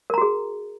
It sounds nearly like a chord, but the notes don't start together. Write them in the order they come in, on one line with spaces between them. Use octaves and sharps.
A#4 A#5 F#4 G#4